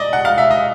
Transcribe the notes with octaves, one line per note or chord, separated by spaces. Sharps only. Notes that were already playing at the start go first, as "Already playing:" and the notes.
Already playing: D5 D#5
F#5
F5
E5
D#5